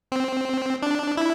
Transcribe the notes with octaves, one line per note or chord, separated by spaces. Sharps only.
C4
D4
E4